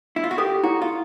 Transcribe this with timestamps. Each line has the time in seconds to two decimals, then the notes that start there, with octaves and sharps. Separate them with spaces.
0.16 E4
0.24 F4
0.31 F#4
0.38 G4 A4
0.63 E4 F#4
0.82 F4